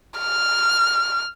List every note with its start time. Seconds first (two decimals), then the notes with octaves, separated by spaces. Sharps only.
0.20 F6